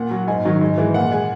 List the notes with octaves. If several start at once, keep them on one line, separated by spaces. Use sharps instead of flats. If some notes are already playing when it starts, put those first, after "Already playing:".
Already playing: A#2 F#5
F#3
G#2 G#5
D#3 F#3
G#2
E3 G#3
A#2 F#5
G#3 G#5